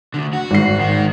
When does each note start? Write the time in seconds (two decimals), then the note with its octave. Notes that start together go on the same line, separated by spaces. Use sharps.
0.14 D2 D3
0.33 F#4
0.51 G#1 C7
0.80 D#3